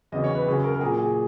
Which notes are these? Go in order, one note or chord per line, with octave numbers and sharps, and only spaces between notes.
E2 C#3 F#3 D#5
C#5
B4
F#2 C#3 F#3 G#4
A#4
A#4
A#2 F#3 G#4
G#4